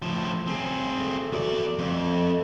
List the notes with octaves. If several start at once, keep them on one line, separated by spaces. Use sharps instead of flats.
A2 F3
C4 C#4 G#4
A3
E2 F#4 D5
F2 A3